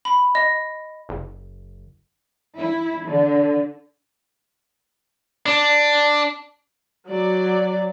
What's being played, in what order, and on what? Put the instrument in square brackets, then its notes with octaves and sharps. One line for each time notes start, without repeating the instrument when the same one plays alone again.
[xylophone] B5
D#5
[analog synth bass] F#1
[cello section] E4
D3
[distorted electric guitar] D4
[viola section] F#3 D5